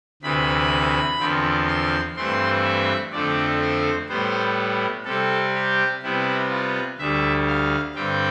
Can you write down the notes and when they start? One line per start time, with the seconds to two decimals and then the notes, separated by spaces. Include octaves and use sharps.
0.22 D2 C3 E3 B5
1.19 E2 D3 F3 C4
1.67 C6
2.16 G2 E3 A3 C4 C6
2.64 E5
3.12 F2 D3 A3 C4 D5
3.61 C5
4.09 A2 G3 B3 C5
5.05 C3 G3 C4 A4
5.54 G4
6.02 C3 G3 B3 E4
6.50 F4
6.98 D2 D3 G3 E5
7.47 F5
7.95 G2 D3 G3 C4 G5